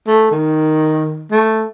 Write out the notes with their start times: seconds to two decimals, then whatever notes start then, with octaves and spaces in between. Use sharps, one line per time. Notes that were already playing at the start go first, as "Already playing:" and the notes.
0.07 A3
0.31 D#3
1.31 A3